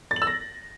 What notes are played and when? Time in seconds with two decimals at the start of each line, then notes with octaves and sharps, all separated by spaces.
0.11 A6
0.16 F#7
0.22 E6
0.27 A#6